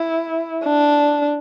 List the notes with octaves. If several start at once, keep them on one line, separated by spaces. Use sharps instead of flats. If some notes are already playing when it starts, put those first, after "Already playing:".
Already playing: E4
D4